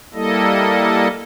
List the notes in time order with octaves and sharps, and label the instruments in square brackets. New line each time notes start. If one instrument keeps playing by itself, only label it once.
[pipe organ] G3 A#3 E4 A4 D#5